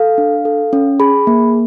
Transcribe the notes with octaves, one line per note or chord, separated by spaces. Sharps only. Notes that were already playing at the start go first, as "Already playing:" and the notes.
Already playing: A4 F5
D4
A4
C#4
G#4 B5
A#3